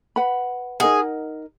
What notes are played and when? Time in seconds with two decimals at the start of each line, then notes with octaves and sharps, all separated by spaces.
0.16 B4 F#5 B5
0.80 D#4 G#4 A#4 D#5 F#5